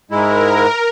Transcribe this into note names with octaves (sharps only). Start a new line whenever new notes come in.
G#2 G#3 E4 A#4